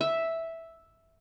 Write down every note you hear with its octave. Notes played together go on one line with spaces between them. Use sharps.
E5